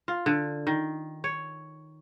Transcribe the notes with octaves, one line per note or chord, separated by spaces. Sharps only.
F4
D3
D#3
C#5